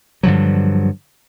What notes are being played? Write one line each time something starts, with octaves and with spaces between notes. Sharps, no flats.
G2 D3 F3 F#3